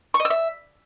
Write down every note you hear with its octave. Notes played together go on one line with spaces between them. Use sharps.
C#6
D#5
E6
E5